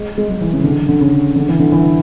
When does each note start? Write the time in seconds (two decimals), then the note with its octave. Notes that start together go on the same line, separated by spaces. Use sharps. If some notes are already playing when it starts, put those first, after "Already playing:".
Already playing: G#3
0.18 G#3
0.29 F#3
0.41 E3
0.53 C#3
0.64 D3
0.89 D3
1.01 C#3
1.36 D3
1.48 E3
1.59 D3
1.72 E3